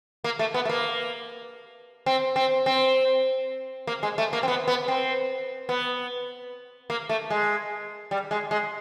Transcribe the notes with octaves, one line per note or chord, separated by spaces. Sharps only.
A#3
A3
B3
A3
A#3
C4
C4
C4
A#3
G#3
A3
A#3
C4
B3
B3
C4
B3
A#3
A3
G#3
G3
G#3
G#3